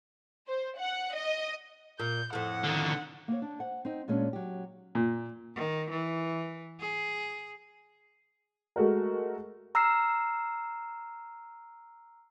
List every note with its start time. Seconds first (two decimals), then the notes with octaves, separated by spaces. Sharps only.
0.47 C5
0.78 F#5
1.14 D#5
2.00 A#2 G6
2.33 F2 A2 F#5
2.64 D3 D#3
3.28 A#3 C#5
3.42 D4
3.59 C5 F#5
3.85 C4 D#4
4.08 A#2 G#3 C#4 D4
4.33 F#3 G4
4.95 A#2
5.55 D#3
5.90 E3
6.80 G#4
8.76 G#3 A3 F#4 A#4
9.75 A#5 E6 F6 C7